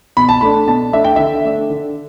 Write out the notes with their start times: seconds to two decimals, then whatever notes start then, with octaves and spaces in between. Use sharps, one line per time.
0.17 B2 B5
0.29 A5
0.41 A3 D4 B5
0.68 B2 A5
0.93 A3 D4 E5
1.04 G5
1.16 D3 E5
1.44 A3 D4
1.70 D3